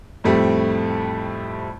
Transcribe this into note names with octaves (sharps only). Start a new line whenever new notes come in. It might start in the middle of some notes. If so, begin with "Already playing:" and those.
F2 A2 G3 A3 C4